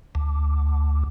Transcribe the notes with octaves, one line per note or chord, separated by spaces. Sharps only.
D2